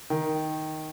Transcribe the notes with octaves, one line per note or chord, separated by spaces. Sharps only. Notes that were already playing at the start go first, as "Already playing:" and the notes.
D#3